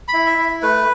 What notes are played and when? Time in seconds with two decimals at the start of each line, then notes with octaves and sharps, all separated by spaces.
0.08 B5
0.13 E4
0.26 E5
0.38 E4
0.62 A3 B4